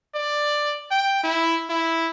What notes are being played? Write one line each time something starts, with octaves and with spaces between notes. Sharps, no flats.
D5
G5
E4
E4